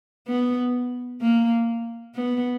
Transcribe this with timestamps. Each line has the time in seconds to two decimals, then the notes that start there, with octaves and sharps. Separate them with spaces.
0.28 B3
1.21 A#3
2.16 B3